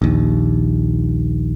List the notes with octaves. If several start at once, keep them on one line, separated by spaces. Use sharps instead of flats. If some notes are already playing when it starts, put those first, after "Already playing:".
A#1 D#2